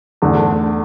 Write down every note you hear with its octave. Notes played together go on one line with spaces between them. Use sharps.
E2 D3 A3